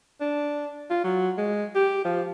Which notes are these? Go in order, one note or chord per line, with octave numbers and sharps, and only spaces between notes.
D4
F4
F#3
G#3
G4
F3